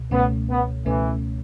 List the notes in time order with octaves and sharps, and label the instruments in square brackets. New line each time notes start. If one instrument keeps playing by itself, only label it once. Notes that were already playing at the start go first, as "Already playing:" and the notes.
Already playing: [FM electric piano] C#2 B2
[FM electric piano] C#2 B2 A3 C#4 [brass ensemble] B3
[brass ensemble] B3
[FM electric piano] C#2 B2 A3 C#4 [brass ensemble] E3